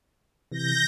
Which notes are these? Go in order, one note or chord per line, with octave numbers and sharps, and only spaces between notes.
C3 E3 G6 A#6